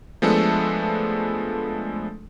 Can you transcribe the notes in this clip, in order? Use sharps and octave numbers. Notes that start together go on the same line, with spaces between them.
F3 G#3 A3 B3 D4 A4